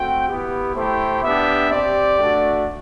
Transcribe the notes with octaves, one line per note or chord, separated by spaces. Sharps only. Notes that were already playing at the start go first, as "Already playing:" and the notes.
Already playing: A3 C4 F#4 G5
B3 E4 G4
A3 E4 G4 C5
B3 D4 G4 E5
C4 G4 D5
A3 D4 F#4